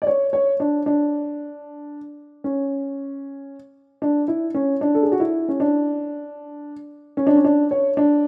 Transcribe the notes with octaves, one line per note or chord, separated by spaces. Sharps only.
D5
C#5
C#5
D4
D4
C#4
D4
E4
C#4
D4
A4
G#4
F#4
E4
C#4
D4
C#4
D4
C#4
D4
C#5
D4